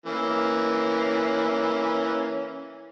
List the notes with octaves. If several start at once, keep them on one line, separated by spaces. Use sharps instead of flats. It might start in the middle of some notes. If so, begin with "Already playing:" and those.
E3 A#3 C#4